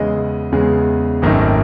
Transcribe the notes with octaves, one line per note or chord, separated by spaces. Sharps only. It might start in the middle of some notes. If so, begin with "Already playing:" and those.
Already playing: E2 C#3 G#3 D#5
E2 C#3 G#3
G#1 F#2 D#3 A3 D#4